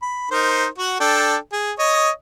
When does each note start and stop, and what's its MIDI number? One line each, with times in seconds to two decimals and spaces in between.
0.02 0.28 83
0.31 0.66 63
0.31 0.66 70
0.31 0.66 72
0.78 0.96 66
0.78 0.96 78
1.00 1.36 62
1.00 1.36 69
1.00 1.36 79
1.52 1.72 68
1.79 2.10 73
1.79 2.10 75
1.79 2.10 87